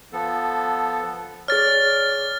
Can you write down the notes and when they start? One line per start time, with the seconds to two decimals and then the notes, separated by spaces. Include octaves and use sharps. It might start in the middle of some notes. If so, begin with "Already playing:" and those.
0.13 F3 B3 A4
1.48 G#4 C#5 D5 F6 A6